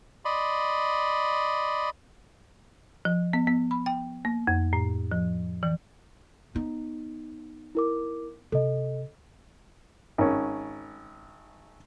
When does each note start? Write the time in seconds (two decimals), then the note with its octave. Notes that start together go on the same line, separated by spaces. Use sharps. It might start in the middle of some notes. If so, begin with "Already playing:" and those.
0.25 D5 D#5 B5 C6
3.05 F3
3.33 B3
3.47 B3
3.71 B5
3.86 G5
4.25 A#3
4.47 F2
4.73 A2
5.12 F3
5.63 E3
6.55 B3 D#4
7.75 E4 A#4 D6
8.52 C3 A4 D#5
10.18 G#1 C#4